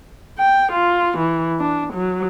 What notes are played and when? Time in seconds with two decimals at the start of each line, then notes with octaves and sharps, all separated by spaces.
0.39 G5
0.72 F4
1.18 E3
1.60 D4
1.94 F#3